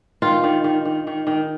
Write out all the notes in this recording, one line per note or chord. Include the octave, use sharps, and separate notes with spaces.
D#3 F4
D#3
D#3
D#3
D#3
D#3